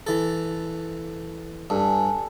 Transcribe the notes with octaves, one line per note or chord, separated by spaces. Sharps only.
E3 A4
G2 A4 G#5